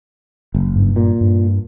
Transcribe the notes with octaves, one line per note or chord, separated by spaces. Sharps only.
F#1
G2
A#2
G2